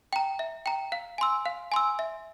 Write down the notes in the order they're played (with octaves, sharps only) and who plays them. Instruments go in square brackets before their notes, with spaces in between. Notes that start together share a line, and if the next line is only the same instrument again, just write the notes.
[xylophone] G5 A#5
E5
G5 A#5
F5
G#5 C6 E6
F5
G#5 C6 E6
E5